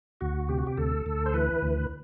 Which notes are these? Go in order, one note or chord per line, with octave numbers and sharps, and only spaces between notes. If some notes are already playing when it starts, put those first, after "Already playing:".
D2 F#4
C3 G4
F#4
G4
D2 A4
D2
C5
E3 B4
D2